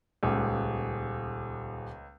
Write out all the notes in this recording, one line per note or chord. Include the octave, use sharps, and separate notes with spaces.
D#1 C#2